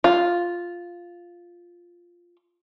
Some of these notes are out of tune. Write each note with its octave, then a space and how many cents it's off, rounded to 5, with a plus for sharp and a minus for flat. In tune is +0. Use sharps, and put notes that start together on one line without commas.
F4 +0